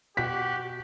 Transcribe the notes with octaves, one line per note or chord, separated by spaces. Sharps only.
B2 F#4 G4 B6